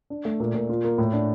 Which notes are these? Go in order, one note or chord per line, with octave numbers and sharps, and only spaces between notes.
D4
A3
A#2
A#2
F4
A#3
A2
D4